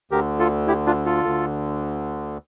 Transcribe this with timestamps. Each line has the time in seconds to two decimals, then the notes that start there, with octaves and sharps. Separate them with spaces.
0.11 D2 D3 G4 A#4
0.39 F4 A4
0.67 E4 G4
0.86 D4 F4
1.06 F4 A4
1.24 D2 D3